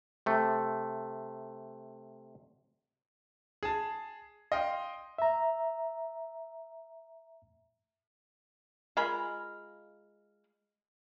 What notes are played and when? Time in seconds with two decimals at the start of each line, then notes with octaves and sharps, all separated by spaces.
0.26 C3 A3
3.63 G#4 A5
4.52 D#5 F5 G5 C6
5.18 E5 A#5
8.97 G#3 F4 A#4 B5